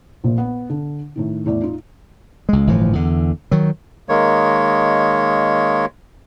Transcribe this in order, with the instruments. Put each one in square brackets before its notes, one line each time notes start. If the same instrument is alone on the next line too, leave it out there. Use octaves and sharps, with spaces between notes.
[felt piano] A#1 A#2
B3
D3
A2 D#3 D#4
E2 A2 D5
D#4 F4
[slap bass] C#2 G#3
G1 A2 E3 F3
E2 D3
D#3 F#3
[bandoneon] D#3 G#3 A#3 C#5